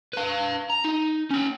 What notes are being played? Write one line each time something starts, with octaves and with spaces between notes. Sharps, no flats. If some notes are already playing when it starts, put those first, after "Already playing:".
B4 F5
A#5
D#4
C#4 G5